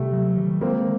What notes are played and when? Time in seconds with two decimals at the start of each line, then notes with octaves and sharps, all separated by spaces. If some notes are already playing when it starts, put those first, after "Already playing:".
Already playing: C3 G3 A3
0.13 F#3
0.37 D#3
0.61 G#3 A#3 C4